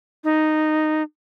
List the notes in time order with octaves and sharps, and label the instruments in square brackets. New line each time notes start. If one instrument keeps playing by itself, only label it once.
[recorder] D#4